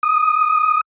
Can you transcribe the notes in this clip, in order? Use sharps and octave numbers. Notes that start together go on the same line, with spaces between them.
D#6